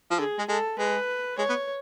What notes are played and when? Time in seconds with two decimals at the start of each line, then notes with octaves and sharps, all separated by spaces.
0.11 F3
0.19 D3 G#4
0.38 G#3
0.49 G#3 A4
0.79 G#3 B4
1.38 G#3 C#5
1.49 B3